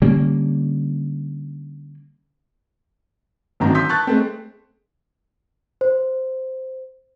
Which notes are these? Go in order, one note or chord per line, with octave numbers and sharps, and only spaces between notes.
D3 G3 A#3 C#4
G#1 F#2 D3 D#3 C4 A#5
C6 D#6 E6 G6 B6
A5 C#6 F#6 A6
G#3 A3 C4
C5